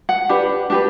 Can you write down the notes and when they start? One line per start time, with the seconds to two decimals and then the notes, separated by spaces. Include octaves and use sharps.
0.09 F#5
0.29 D4 G4 B4
0.70 D4 G4 B4